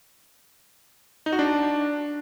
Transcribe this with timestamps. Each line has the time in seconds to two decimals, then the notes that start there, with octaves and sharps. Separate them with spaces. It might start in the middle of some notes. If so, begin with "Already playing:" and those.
1.26 D#4
1.32 F#4
1.39 D4